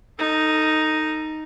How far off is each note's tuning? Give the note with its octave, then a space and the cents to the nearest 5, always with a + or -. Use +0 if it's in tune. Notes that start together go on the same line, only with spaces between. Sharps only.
D#4 +0 A4 +30